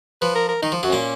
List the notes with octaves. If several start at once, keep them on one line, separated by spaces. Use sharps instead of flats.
F3 B4
A#4
A#4
D#3 D#4
F3
F#2 F#3
A#2 A#3 C#4